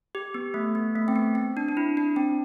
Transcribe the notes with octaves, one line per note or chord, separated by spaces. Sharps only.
G4
B3
A3
B3
A3
C4
B3
C4
D4
D4
E4
D4
C4